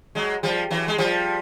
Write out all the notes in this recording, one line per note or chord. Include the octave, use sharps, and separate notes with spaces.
F#3 G#3
F3 G3
E3 F#3
G#3
F3 G3